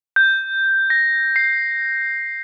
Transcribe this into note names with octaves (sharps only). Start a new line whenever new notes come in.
G6
A#6
C7